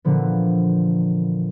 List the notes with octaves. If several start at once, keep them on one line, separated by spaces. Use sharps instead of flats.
A#2 D3 E3 F3 B3